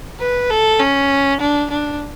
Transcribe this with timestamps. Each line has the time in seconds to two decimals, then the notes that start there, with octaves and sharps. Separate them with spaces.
0.20 B4
0.50 A4
0.80 C#4
1.40 D4
1.70 D4